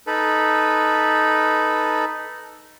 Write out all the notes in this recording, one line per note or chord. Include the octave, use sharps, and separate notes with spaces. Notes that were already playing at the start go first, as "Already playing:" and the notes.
D#4 A4 B4